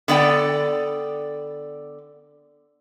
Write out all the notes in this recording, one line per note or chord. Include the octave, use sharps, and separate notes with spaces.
D3 B3 D5 G5